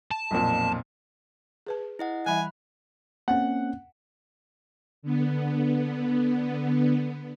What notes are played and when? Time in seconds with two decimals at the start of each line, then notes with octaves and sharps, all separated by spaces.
0.11 A5
0.31 B1 F2 A#2
1.67 G#4 B4 A5
1.99 E4 D#5 F#5
2.26 E3 G3 E5 G#5 B5 F#6
3.28 A#3 C4 C#4 F#5
5.02 D3 B3